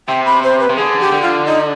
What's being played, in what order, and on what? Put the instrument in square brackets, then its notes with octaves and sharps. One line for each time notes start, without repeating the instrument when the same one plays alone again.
[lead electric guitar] C3 [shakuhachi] G5
[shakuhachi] B5
C5
B4
[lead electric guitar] C3
[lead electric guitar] D3 [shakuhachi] G#4
[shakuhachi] G4
[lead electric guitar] D3
[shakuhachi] F4
D#4